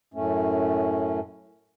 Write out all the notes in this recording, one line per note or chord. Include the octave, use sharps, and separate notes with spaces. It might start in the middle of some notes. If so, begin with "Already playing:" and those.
F#2 A2 A3 C#4